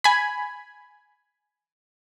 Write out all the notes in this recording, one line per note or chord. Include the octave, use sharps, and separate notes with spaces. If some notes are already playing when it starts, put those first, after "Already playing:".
G#5 B5